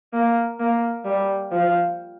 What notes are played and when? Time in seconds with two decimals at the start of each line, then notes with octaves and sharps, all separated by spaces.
0.13 A#3
0.60 A#3
1.05 G3
1.52 F3